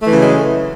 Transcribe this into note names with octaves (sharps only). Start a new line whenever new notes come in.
C#3 E3 F#3 G#3 A3